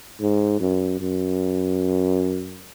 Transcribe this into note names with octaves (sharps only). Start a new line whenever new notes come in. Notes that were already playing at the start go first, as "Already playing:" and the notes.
G#2
F#2
F#2